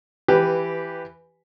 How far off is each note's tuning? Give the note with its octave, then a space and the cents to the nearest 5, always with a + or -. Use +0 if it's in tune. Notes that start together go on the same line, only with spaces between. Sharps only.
E3 +15 G4 +0 B4 +0